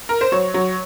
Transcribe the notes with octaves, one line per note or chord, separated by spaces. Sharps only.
A#4
C5
F#3 C#5
F#3